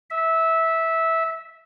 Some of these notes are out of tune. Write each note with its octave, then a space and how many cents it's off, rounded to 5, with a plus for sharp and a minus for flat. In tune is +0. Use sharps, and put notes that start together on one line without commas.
E5 -15